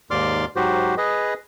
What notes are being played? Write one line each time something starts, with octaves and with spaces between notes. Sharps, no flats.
D#2 G#2 D5 C6 D6 F6
G#2 F#3 F#4 G4 C5
G#4 B4 D#5